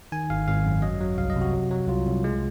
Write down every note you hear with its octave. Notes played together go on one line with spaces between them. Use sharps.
D#3 G#5
G#1 F5
G#1 F5
F#2
F#3 D#5
F#3
C2 F5
D#5
C3
F#4
F#3
F#3
C2 F4
C2
G#3